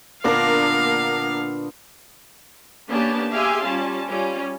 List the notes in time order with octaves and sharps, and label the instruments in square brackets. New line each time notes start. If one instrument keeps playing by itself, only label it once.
[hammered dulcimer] A#2 D3 B3 [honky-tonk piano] A#3 D4 A#4 [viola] F5
[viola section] A#3 B3 C#4 D4 G4 A5
G4 G#4 E5 F5 G#5 C6
G3 C#4 F4 A5
G3 C#4 F4